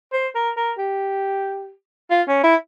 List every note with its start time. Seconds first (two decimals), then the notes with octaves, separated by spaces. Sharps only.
0.13 C5
0.35 A#4
0.57 A#4
0.78 G4
2.10 F4
2.27 C#4
2.43 E4